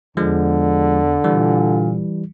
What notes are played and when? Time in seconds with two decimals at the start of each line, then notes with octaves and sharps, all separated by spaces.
0.17 E2 D3 F3 G#3
1.24 A#2 E3 G3